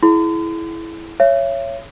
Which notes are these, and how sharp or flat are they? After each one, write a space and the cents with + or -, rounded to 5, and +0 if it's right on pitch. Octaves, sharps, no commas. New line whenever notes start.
E4 +0 G#4 +40 C6 -45
C#5 +0 E5 +40